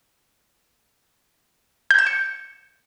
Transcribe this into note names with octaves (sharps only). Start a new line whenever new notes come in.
G6
E7
C#7